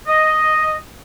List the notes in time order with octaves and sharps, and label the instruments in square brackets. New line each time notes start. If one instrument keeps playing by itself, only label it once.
[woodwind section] D#5